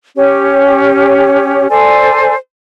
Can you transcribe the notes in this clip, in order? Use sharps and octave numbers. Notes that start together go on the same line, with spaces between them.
C#4 G4 C#5
A4 C5 D5 G#5